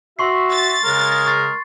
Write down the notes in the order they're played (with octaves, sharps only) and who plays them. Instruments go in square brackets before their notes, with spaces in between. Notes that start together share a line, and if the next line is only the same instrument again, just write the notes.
[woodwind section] F#4 E5 [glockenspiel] C6 C#6 C7
[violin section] A6
[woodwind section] C#3 G#3 [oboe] A#4
[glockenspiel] C#6 A6 C7